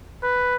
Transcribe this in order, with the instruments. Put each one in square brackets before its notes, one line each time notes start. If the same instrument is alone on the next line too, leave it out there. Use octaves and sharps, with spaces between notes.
[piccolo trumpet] B4